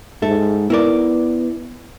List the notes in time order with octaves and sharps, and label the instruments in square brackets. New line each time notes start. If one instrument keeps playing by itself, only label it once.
[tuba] G#2 [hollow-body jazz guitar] A4 E5
[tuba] B3 [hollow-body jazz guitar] E4 A#4 D5